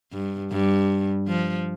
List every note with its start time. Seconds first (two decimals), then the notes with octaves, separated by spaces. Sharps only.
0.13 G2
0.52 G2
1.28 F3